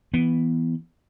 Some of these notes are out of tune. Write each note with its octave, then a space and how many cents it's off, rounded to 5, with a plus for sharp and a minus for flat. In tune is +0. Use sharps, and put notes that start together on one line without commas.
E3 +0 B3 +0